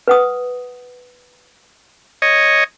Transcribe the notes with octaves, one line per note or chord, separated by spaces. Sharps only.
B4 F#5 D#6
C#5 D#5